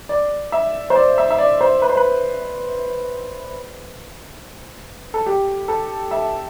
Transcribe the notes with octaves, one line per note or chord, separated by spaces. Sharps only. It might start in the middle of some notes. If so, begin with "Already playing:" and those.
D5
E5
C5
D5
E5
E5
D5
C5
B4
C5
B4
A4
G4
A4
E5